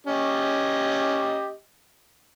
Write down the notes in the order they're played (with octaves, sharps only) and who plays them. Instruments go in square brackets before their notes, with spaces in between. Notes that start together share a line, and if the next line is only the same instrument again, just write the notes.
[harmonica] C#4 G4 D#5